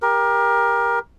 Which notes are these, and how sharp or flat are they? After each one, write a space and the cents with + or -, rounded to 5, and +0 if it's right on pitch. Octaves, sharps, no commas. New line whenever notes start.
G4 +20 A#4 +20